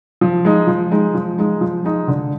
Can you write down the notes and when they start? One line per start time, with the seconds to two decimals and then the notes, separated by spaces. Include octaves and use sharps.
0.21 F3
0.45 G#3 D#4
0.67 F3
0.91 G#3 D#4
1.15 F3
1.38 G#3 D#4
1.61 F3
1.84 G#3 D#4
2.08 D3